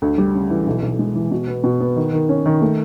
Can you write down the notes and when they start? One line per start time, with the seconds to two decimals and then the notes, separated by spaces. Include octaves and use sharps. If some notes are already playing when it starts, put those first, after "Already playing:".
0.02 D2
0.18 G3
0.35 C#3
0.50 E3
0.67 B1
0.82 B1
0.99 G#3
1.15 E3
1.31 B2
1.47 B3
1.64 B2
1.80 B3
1.96 D#3
2.13 D#3
2.29 C#4
2.46 D#3
2.61 A3